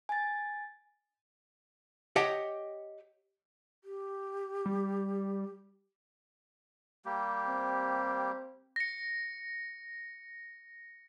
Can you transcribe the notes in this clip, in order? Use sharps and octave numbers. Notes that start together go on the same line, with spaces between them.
G#5 A6
G4 C#5 D#5 F#5 G5 A5
G4
G3
G3 A#3 G4
C4
A#6 C#7